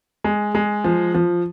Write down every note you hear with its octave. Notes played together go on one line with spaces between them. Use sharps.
G#3
G#3
F3
F3